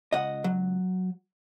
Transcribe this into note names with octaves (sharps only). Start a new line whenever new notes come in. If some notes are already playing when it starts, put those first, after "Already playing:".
C#2 D#5 F#5
F#3